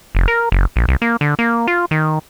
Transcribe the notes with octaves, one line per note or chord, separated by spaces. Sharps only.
F1
A#4
F#1
A#1
C2
A#3
D3
A#3
F4
D#3